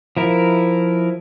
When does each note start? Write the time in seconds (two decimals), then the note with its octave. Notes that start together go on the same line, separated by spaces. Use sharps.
0.17 F3 E4 A#4